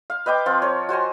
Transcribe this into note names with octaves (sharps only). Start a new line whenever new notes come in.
F5
B4 D#5 G5 D6
F3 C4 F4
A#4 C#5
F#4 C5 G#5 A#5